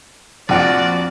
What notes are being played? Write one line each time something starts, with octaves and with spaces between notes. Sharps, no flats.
A#1 F2 F4 F#4 D5 F#5 F6 D7